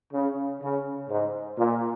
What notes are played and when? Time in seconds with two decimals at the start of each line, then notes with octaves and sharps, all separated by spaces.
0.13 C#3
0.62 C#3
1.10 G#2
1.58 A#2